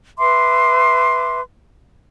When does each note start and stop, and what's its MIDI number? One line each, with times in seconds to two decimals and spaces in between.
0.19 1.40 71
0.19 1.40 76
0.19 1.40 84
0.19 1.40 86